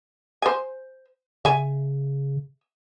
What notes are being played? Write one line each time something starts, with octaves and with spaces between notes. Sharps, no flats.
C5 G#5
C#3 E5 G#5